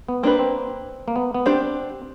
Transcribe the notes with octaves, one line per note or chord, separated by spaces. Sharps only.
B3
A#3 C4 D4 G4 B4
C4
A#3
B3
B3
C4 D4 G4 C5